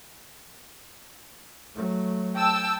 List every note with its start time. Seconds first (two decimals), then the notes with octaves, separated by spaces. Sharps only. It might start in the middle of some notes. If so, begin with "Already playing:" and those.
1.75 F#3 A3
2.37 G5 A5 E6